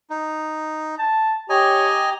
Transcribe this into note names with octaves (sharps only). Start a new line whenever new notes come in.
D#4
A5
G4 C#5 D#5 G#5 A#5